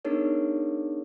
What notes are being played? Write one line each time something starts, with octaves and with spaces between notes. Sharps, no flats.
B3 D4 D#4 G#4 A#4 C#5